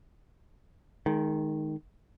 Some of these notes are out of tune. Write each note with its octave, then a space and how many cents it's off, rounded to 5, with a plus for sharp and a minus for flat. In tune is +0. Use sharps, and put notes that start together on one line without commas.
D#3 +0 G#3 +25